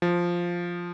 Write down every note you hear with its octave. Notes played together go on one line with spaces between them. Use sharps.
F3